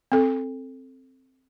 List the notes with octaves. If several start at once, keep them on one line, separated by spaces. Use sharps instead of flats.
C4 A4